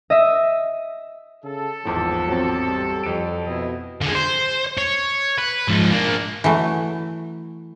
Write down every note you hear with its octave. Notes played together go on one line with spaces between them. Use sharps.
D#5 E5
C#3 A4
G#1 E2 A2 F3
F#3 C4
G3
F2 D7
B2 E4 D#5
D3 G#3
C5
C#5
B4
G#2 F3
A#3 D4
E3 F#3 A3